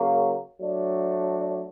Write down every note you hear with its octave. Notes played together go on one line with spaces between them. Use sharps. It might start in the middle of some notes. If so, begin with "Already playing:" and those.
Already playing: C#3 F#3 A#3
F#3 A3 D4